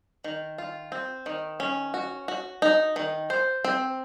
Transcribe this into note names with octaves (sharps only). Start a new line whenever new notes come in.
D#3
F4
C4
D#3
C#4
F#4
F#4
D#4
D#3
C5
C4